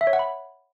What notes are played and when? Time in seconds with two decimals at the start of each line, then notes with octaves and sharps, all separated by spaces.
0.01 E5
0.07 C#5
0.13 F#5
0.19 B5